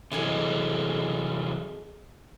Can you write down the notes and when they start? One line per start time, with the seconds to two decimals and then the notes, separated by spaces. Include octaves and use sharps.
0.12 C3 E3 F#3 G#4 A4 D#5